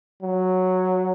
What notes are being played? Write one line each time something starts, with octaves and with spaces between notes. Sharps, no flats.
F#3